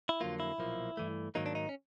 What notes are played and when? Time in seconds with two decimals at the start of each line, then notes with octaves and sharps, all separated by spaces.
0.09 E4
0.21 F2 D3 F#3 A#3 F4
0.40 E4
0.58 B1 A#2 F3 A#3
0.97 G2 E3 A3
1.35 G#2 D#3 F#3 A#3 D#4
1.46 D4
1.55 D#4
1.69 C#4